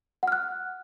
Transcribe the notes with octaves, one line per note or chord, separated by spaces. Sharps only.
F#5 F6 F#6